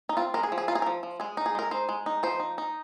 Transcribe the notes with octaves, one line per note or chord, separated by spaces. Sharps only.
D#4
C4 F4
G#3 A#4
G#4
F3
G#4
D#4 F4
G#4
A#4
F3
F3
G#3 G#4
D#4
G#4
G#3 A#4
D#4 C5
G#3
D#4
F3 C5
D#4
D#4